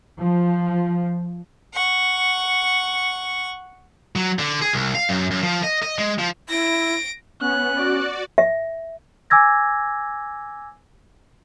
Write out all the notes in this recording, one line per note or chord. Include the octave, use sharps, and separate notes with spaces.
F3
F#5 C#6
F#3
D3
G#4
C2
F5
F#2
F#2
F3
D#5
D#5
G#3
F3
E4 A#6 D7
B3 C#4 F#6
F#4 D5
E5
G#5 D6 E6 G#6 A#6